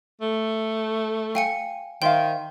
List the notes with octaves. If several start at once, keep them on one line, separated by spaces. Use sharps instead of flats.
A3
F5 G5 G#5 C#7
D#3 C5 E5 F5 G5 C6